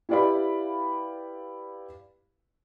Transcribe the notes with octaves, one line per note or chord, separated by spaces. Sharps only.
E4 G4 B4 D5 F5 B5